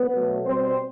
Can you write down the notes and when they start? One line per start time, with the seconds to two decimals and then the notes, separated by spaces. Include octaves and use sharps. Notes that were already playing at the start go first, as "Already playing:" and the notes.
Already playing: B3 B4
0.14 B2 F#3 A3
0.44 B2 G3 C4 C5